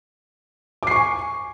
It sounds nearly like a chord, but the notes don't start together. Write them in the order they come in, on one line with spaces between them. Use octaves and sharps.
D6 C7 C#6 G#5